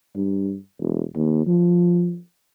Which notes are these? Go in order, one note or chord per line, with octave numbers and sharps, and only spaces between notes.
G2
E1
D#2
F3